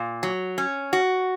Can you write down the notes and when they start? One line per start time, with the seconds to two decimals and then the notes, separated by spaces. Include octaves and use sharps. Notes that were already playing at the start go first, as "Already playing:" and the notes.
Already playing: A#2
0.23 F#3
0.58 C#4
0.93 F#4